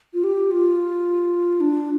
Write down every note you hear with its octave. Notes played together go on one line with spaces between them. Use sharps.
F4
G4
F4
D4